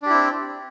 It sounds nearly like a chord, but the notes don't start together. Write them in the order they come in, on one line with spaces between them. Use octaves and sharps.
D4 G4 E4 C4